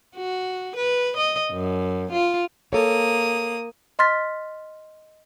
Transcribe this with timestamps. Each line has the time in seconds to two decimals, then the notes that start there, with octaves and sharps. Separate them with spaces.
0.16 F#4
0.76 B4
1.17 D#5
1.52 F#2
2.12 F4
2.73 A#3 A4 C#5 D#6
3.99 D#5 C6 F6 A6 B6